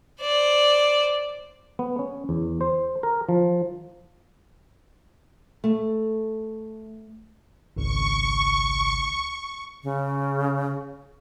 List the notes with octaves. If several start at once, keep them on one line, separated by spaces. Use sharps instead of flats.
C5 D5
B3
C#4
E2
C5
A#4
F3
A3
G#1 C#2 C#3 C#6
C#3